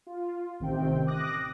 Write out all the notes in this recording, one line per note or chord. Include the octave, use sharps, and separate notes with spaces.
F4
A1 C3 D#3 C4 G5
D6 D#6 F#6 A#6